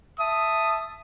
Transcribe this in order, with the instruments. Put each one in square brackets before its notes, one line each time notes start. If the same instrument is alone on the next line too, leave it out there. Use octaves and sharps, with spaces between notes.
[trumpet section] E5 A5 D#6